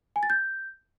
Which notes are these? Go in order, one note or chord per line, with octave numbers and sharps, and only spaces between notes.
G#5
A6
G6